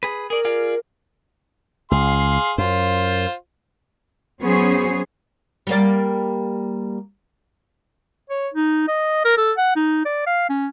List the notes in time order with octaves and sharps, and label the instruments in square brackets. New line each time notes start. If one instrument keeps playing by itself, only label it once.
[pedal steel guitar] G#4 B4
[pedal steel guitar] G#4 D5 [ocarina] A#4
[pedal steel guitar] F4 G#4 D5
[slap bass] C#2 [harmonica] G#4 F5 C6
[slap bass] F#2 [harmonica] F4 C5
[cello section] F#3 B3 C#4 G#4 C5 C#5
[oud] G3 A#3 D5
[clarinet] C#5
D#4
D#5
A#4
A4
F#5
D#4
D5
F5
C#4